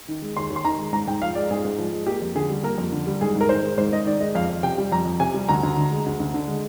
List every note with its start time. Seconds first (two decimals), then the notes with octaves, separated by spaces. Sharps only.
0.08 D#3
0.22 G#3
0.37 D#2 C6
0.50 D#2
0.56 C6
0.65 D#3 A#5
0.79 G#3
0.93 G#2 A#5
1.07 G#2 G5
1.22 F3 F5
1.35 G#3 D5
1.51 G#2 G#4
1.65 G#2
1.78 F3
1.93 G#3
2.06 A#3 G4
2.22 F2
2.35 D3 G#4
2.50 G3
2.63 A#3 A#4
2.78 F2
2.92 D3
3.07 G3
3.21 G#2 G#4
3.35 G#2
3.41 A#4
3.49 D#3 C5
3.63 G#3
3.78 G#2 C5
3.93 G#2 D#5
4.06 D#3 D5
4.20 G#3 D#5
4.35 F2 F5
4.49 F2
4.63 C3 G5
4.78 G3
4.92 F2 A#5
5.05 F2
5.20 C3 G#5
5.34 G3
5.49 D2 A#5
5.63 D2
5.77 D3
5.91 G#3
6.06 D2
6.20 D2
6.34 D3
6.48 G#3